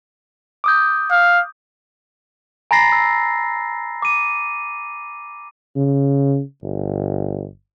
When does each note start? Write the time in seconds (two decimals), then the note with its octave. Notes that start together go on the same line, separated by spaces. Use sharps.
0.64 D6 D#6 G6
1.11 F5
2.71 G#5 A#5 B5 A6 A#6 C7
2.92 E6
4.02 D6 D#7
5.76 C#3
6.63 G1